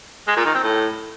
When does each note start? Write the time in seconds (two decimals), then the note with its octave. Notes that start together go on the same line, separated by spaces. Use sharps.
0.28 G#3
0.37 A#2
0.46 D#3
0.55 C4
0.64 A2